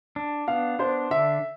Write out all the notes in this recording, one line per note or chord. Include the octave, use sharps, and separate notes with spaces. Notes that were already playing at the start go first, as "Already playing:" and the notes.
D4
B3 F5
D4 C5
D3 E5